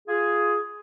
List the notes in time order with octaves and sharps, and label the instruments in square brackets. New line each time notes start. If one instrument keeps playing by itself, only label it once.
[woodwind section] F4 G#4